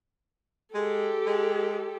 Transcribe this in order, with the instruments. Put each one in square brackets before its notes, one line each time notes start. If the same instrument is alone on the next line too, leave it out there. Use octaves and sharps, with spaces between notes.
[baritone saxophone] G#3 [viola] G4 A4
[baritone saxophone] G#3